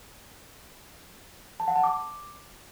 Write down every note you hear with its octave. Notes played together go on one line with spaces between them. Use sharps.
A5
F#5
A5
D6